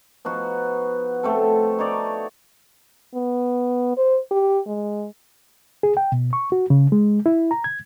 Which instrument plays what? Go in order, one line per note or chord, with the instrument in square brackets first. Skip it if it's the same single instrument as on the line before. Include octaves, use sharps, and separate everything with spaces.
[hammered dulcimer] F3 B3 D#4 F#4
A3 C4 A4
D#4 C#5 D5
[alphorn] B3
C5
G4
G#3
[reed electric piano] G#4
G5
B2
C#6
F#4
C#3
G#3
E4
A#5
G#6